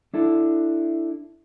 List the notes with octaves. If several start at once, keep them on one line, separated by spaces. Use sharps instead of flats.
D4 E4 A4